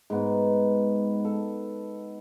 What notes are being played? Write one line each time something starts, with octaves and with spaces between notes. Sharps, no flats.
G#2 B3
A4